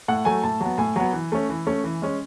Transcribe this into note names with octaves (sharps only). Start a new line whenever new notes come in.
A2 F#5
F#3 A3 G#5
A2 A5
F#3 B3
A2 G#5
F#3 B3
E3
A3 C#4
E3
A3 C#4
E3
G#3 C#4